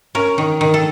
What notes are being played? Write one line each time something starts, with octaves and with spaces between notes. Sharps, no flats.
C#4 A#4
D#3
D#3
A4